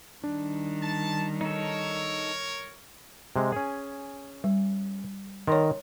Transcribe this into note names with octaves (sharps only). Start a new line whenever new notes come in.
D#3 G3 D4
A5
D#4 A4 A#4 C#5
C3 G#3
C#4 G#4
G3
D#3 A#4 C#5 A#5 C6